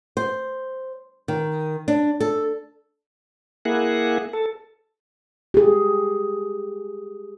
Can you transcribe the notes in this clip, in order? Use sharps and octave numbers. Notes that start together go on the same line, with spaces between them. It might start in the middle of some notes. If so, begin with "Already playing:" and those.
C5
D#3
D4
A4
A#3 E4 G#4 F#5
A4
G4 G#4